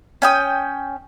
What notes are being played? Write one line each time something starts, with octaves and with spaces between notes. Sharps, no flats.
C#4 G5 D#6